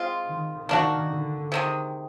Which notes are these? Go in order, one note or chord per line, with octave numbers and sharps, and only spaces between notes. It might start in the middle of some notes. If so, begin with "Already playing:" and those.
Already playing: G#3 C4 F4
D#3
D#3 A#3 D4 F#4
D3
C3 D#3 G#3